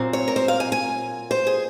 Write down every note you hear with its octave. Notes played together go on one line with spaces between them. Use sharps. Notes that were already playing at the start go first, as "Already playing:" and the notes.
Already playing: A#2 F#3 C4
C#5
A#4
C5
F5
G#5
G#5
C5
G#4